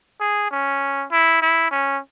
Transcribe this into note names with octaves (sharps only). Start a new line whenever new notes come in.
G#4
C#4
E4
E4
C#4